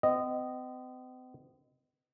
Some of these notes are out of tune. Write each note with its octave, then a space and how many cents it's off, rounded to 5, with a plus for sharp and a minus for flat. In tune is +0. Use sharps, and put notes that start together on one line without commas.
C4 -45 D#5 -10